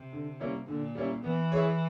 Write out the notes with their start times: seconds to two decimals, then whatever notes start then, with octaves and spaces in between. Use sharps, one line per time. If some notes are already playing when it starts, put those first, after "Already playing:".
Already playing: C3
0.13 D3
0.40 G3 A#3 C#4 E4
0.68 A#2 D3
0.95 G3 A#3 C#4 E4
1.24 E3 B3
1.52 E4 G#4 C#5